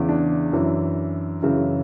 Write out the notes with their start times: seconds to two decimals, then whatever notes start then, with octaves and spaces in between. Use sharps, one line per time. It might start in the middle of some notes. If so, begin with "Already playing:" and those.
Already playing: E2 C#3 E3
0.09 D4
0.53 F#2 E3
1.42 F#2 C#3 E3